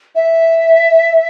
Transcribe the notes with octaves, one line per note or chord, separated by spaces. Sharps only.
E5